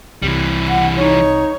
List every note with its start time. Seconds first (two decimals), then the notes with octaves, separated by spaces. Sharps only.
0.22 C2 C3 E3 G3
0.68 F#5
0.98 D#4 C#5